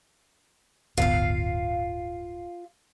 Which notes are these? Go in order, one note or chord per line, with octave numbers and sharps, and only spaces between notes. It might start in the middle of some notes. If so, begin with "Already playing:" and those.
D1 G1 B3 F4 F5